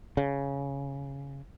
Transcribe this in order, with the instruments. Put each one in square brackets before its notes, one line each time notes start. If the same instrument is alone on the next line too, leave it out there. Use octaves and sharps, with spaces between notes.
[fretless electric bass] C#3